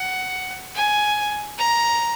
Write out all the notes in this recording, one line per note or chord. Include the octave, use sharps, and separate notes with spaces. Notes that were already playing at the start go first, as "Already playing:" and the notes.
Already playing: F#5
G#5
A#5